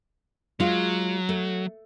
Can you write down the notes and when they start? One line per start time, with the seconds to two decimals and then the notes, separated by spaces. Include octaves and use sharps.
0.60 F#3 G#3 F4
1.29 A3